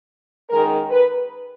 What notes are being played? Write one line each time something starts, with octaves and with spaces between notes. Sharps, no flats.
F#2 D#3 G#3 A#4
B4